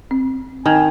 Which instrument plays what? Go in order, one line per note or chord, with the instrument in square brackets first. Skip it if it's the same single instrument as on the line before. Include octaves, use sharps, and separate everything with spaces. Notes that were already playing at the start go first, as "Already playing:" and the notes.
[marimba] C4
[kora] D#3 [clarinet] G#5